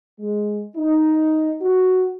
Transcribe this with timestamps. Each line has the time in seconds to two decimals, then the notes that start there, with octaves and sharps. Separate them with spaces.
0.19 G#3
0.77 D#4
1.61 F#4